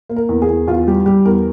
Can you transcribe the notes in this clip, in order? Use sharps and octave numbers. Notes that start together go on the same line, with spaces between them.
A#3
A#4
E2
G#4
E2
E2 F4
G3 G4
G3 G4
E2 A#4